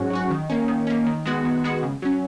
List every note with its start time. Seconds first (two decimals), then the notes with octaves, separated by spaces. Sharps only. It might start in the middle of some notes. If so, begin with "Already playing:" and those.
Already playing: G#2 F#3 C#4 F#4
0.10 F#3 C#4 F#4
0.31 D#3
0.50 A#3 C#4
0.68 D#3
0.87 A#3 C#4
1.06 D#3
1.25 G#3 B3 F#4
1.45 D#3
1.64 G#3 B3 F#4
1.83 C#3
2.02 F#3 C#4